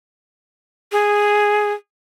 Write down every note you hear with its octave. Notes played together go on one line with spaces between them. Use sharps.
G#4